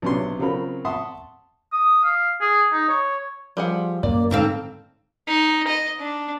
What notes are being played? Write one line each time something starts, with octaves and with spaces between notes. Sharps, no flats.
B1 C3 C#4 D4 C6
C#3 F#3 C4 F4 A#4 B5
E5 F#5 A5 C6 C#6 D#6
D#6
F5
G#4
D#4
C#5
F3 G3 G#4 F#5
F#2 A#3 D5
G#2 D3 C4 C#4 A4 F5
D#4
D#5
D4